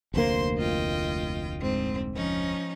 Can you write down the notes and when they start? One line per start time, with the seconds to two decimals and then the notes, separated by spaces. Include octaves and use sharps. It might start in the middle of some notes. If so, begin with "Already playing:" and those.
0.14 F1 D2 A#3 C5 C6
0.57 F4 D#5 G5
1.58 G#2 C4
2.15 F3 C#4 D#4